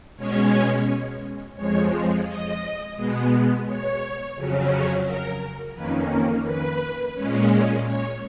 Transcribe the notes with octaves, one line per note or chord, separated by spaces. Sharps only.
B2 G#3 C#4 C#5
F2 F3 G#3 C#5
D#5
B2 G#3 B3
C#5
F2 C#3 F#3 C#4
A#4
F2 D#3 A#3 C#4 B4
A#4
B4
A#2 G#3 C#4
C#5